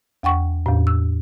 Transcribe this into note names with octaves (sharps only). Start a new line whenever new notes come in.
E2 F#5 G5 C#6
E2 A2
E6